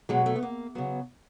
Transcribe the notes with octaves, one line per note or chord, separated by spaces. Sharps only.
B2 F#3 G#3
A3
B3
A#3
C#3 F#3 B3